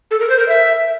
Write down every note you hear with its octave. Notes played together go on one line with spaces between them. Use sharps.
A4
A#4
C5
A#4
E5